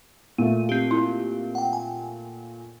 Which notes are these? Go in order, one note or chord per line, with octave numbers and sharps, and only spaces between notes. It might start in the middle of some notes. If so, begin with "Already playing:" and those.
A#2 A3 D#7
C4 G4
E4
F#5 G5
G#5